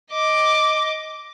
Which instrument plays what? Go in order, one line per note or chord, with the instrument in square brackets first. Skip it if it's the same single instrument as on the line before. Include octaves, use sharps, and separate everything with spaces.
[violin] D#5 D6